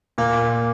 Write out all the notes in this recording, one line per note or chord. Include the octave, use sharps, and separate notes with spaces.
A#2 A#3